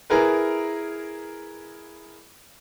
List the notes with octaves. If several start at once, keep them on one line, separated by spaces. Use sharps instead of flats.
E4 G#4 A#4 B4